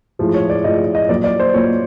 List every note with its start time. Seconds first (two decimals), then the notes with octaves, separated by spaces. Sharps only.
0.19 A2 F3 G#3
0.34 C#5
0.50 D5
0.64 A2 F3 G#3 D#5
0.95 D#5
1.09 A#2 F#3 A#3 D5
1.24 D5
1.40 C5
1.54 A#2 F#3 A#3 C#5